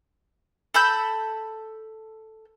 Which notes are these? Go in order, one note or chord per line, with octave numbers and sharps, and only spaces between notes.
A4 B5 E6 G6